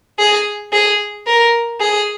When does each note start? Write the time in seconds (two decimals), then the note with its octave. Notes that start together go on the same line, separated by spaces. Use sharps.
0.19 G#4
0.73 G#4
1.27 A#4
1.80 G#4